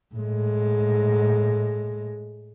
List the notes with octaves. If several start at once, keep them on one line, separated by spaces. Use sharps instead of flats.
A2 G#3